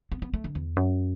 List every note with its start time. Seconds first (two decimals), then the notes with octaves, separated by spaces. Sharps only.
0.12 B3
0.22 B3
0.34 A3
0.44 D3
0.55 E2
0.77 F#2